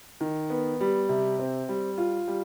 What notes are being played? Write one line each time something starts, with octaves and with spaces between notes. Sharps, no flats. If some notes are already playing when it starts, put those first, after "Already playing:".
D#3
B3
G3
C3
C4
G3
F4
G3